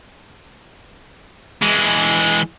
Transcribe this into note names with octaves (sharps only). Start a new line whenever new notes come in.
E3 G#3